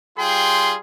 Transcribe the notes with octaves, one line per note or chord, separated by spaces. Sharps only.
G3 F4 G#4 G5 C6